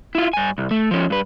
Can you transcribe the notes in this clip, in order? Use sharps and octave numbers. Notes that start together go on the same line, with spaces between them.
E4 F4
G2 G#5
C2
A3
F3 C#4
G2 B4